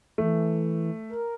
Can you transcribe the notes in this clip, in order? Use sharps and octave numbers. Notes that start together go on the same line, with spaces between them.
E3 A3
A#4